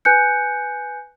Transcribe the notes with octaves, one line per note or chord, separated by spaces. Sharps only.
B4 G#5 F#6 G6 C#7